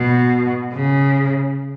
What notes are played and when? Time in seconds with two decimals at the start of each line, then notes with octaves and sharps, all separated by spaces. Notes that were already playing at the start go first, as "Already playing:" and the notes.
Already playing: B2
0.73 C#3